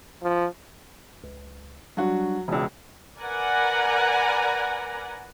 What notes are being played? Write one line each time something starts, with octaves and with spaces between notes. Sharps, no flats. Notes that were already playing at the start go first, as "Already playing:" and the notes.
F3
C#2
F#3 G3 D4 F#4
E1 C#2 E3 E6
A#4 B4 D5 F#5 G#5 A#5